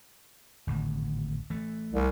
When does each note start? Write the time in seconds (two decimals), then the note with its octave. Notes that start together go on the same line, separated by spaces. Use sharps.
0.67 G#1 D2 A2
1.50 E3 A3
1.93 C2